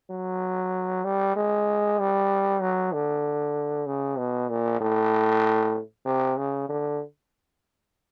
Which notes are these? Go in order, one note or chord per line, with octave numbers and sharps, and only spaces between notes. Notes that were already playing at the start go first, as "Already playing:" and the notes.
F#3
G3
G#3
G3
F#3
D3
C#3
B2
A#2
A2
C3
C#3
D3